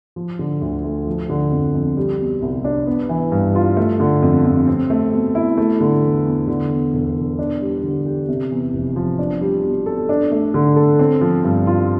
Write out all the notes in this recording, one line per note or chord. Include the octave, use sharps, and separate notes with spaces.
F3
D3
D2
A3
F3
D3
F2
F2
G3
B2
C2
D4
B3
E3
G2
F4
A3
D3
F2
F2
C4
A3
B2
E4
A3
D3
E2
E2
D3
E2
E1
E1
D4
G3
D3
G4
C3
E2
F1
F3
D4
G3
B2
A4
D4
A3
D3
A4
C4
F3
G2
F4